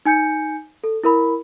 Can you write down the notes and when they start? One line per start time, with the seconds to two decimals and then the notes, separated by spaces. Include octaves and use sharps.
0.06 D#4 G#5 G6 C#7
0.84 A4
1.03 E4 A#4 B5